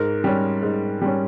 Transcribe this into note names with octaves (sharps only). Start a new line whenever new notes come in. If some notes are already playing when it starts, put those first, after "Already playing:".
Already playing: G#2 A#4
G3 C#4
G#2
G3 C#4